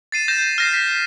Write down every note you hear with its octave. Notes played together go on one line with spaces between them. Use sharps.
A6 C7 D#7 E7
G6 A#6 E7
F6 A#6 C7
B6